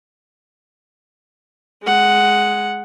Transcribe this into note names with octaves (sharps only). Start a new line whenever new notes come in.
G#3 F#5